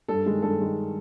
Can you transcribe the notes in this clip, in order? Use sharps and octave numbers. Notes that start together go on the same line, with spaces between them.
G2 A4
D#3 G#3
G2 A4
D#3 G#3